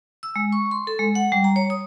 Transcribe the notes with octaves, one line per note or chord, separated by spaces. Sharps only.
E6
G#3
C#6
C6
A4
G#3
F#5
G3
A#5
C#5
D#6